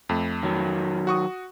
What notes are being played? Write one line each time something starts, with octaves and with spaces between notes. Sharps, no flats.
F2 A3
D#3 F#3
F#4 C#6 D#6